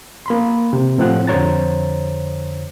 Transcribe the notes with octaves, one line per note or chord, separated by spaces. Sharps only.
A#3 B5 C6
C3
A2 F3 C4 F#5 F#6
F2 D3 C5 C#5 A#5 A6